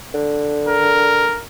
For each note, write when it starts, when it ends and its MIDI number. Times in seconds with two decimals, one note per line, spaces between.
0.14 1.36 50
0.68 1.42 70